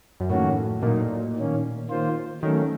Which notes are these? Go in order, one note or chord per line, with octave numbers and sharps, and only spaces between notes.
F#2
F2 A2 D#3 A#3 C#4 F#4
A#2 F#3 A#3 D#4
D#3 A#3 C#4
D#3 A#3 F4 C5
D#3 F#3 A3 C#4